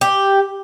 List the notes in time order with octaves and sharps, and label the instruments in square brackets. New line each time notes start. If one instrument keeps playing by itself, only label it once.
[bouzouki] G4